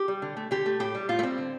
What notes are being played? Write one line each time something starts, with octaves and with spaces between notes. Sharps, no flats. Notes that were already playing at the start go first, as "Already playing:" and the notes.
Already playing: G4
G3
D3
A3
D3 G4
A3
A2 G4
G3
A2 F4
A3
G3 C4
D3